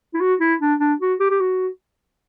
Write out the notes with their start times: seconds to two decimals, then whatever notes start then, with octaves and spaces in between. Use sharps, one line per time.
0.14 E4
0.21 F#4
0.41 E4
0.61 D4
0.80 D4
1.01 F#4
1.20 G4
1.31 G4
1.40 F#4